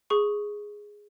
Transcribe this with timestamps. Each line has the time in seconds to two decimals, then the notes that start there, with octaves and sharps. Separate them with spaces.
0.10 G#4 C#6